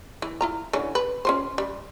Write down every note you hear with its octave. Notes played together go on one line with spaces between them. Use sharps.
E3
E4 F4 A#5
D3 E3 C#4
B4
C#4 F4 C5
G3